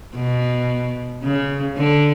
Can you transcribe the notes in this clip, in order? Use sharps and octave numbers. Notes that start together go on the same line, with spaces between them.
B2
C#3
D3